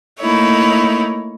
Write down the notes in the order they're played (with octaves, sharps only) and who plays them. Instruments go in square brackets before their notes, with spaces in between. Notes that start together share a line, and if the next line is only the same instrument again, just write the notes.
[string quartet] A3 A#3 D#4 E4 C#5